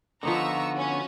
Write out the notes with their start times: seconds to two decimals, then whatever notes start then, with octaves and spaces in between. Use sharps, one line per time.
0.23 D3 F3 B3 D#4 D#5 A#5 C#6 E6
0.74 C#4 F#4